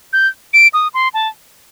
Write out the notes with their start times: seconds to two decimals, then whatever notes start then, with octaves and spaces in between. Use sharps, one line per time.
0.13 G6
0.53 D7
0.74 D#6
0.94 C6
1.14 A5